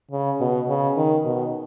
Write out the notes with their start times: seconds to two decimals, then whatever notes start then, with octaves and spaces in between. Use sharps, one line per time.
0.11 C#3
0.40 B2
0.68 C#3
0.97 D#3
1.25 B2